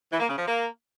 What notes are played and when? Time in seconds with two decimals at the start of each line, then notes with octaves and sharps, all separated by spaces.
0.11 E3
0.20 A#3
0.29 C#3
0.38 F3
0.47 A#3